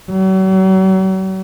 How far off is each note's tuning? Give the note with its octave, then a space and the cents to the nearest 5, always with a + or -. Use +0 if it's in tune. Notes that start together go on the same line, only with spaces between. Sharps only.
F#3 +40